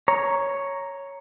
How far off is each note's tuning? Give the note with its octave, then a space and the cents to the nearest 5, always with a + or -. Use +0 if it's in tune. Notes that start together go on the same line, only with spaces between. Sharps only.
C#5 +0 A#5 +0